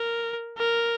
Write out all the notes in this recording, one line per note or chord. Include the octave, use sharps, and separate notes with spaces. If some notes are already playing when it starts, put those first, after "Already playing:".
Already playing: A#4
A#4